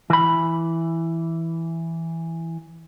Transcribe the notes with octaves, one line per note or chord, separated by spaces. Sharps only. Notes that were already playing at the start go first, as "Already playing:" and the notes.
E3 B5